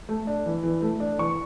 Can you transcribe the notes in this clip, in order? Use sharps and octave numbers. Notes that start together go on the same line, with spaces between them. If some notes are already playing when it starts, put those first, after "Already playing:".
A3
D4
E3
E3
A3
D4
E3 C#6